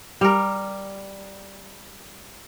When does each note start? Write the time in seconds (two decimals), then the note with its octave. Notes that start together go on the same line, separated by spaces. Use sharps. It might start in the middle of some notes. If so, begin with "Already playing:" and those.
0.21 G3 A#4